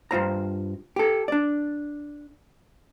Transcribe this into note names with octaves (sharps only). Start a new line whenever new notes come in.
G2 F4 C5 A#5
G4 A4
D4 D5